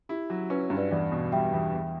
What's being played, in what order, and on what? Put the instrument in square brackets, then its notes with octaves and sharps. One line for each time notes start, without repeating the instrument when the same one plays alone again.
[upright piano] E4 [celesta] G4
[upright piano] F#3
[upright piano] C#4 [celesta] B4
[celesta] C#5
[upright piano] G2
[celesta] B4 D5
[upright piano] E2 [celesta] D5 F#5
[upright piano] B2
[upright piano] G3 [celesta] E5 G5
[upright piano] E2
E2